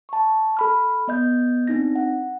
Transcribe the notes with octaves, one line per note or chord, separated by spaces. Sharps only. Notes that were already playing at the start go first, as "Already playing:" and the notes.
A5 C#6
A4 B5 F6
B3 D#5 G6
C4 D4 D#4 A#6
F#5